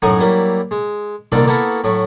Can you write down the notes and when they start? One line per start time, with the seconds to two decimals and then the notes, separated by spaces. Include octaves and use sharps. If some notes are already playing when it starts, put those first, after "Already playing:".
0.02 F#2 A2 D#4 F#4 G#5 A#5
0.19 F#3 G3 A#3 E4
0.71 G#3
1.32 C2 D3 D#3 A#3 A4 D5
1.47 A#3 B3 E4 F#4 A4 A#4
1.84 A2 F#3 A3